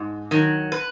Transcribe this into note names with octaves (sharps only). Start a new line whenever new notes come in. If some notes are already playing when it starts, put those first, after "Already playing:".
Already playing: G#2
D#3 F#3
B4